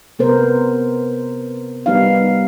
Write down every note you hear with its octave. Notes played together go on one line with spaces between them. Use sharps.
C3 B3 A#4 C5
G3 B3 D#4 F5